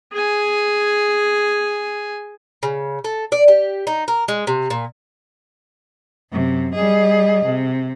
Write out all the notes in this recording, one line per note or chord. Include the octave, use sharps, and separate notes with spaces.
G#4 G#5
C#3
A4
D5
G4
D#4
A#4
G#3
C3
A#2
F#2 C3
G3 G#4 D#5
C3